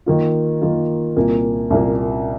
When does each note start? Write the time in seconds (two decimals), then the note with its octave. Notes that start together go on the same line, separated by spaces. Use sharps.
0.06 D#3 A#3 F4
0.62 D#3 A#3 F4
1.17 C2 A#2 A#3
1.70 C2 A#2 A#3